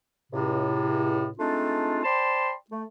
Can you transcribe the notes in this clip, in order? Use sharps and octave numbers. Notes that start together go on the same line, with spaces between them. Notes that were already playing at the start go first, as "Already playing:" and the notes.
C#2 A2 C3
G#3 A3 C4 D4 D#4 F4
C5 D5 G5 A5 B5 C6
A3